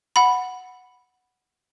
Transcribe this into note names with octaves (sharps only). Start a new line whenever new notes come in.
F#5 B5